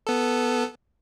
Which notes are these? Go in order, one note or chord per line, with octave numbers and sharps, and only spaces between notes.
B3 A4